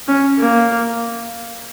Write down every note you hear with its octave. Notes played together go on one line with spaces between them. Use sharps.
C#4
A#3